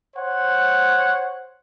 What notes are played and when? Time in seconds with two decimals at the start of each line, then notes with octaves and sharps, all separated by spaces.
0.16 C5 C#5 F#5